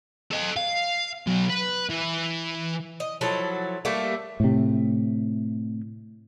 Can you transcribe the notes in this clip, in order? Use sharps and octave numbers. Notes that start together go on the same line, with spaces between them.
A4 D#5
F5
B2 F#3
B4
E3
D#5
F3 F#3 E4 A4
G3 A3 A#3 A4
A2 C3